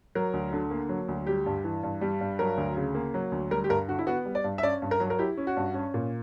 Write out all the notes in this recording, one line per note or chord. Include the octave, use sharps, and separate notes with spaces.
F#3 A#4
D2
D3
A#3
F#3
D2
G3 G4
G2
E3
G2
G3
G2
F#3 A#4
D2
C#3
A#3
F#3
D2
G3 A#4
G4
G2 A#4
D3 F#4
E4
B3 F#4
G3
D5
G2
E5
C#4 D5
G2
A#4
F#3
A#4
E4 G4
C#4
F#4
G2
C#4
A#2